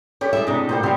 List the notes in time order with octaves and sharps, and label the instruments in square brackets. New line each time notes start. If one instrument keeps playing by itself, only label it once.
[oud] D3 C#4 [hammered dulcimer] G4
[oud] A2 G#4 [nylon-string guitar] G3 E5
[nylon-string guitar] C3 D4 [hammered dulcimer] D#4 D#5
[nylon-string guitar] A#2 A#3 F#5 [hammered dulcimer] G3 G4 C5
[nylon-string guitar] C#3 F4 [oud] G4 C5 [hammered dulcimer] E5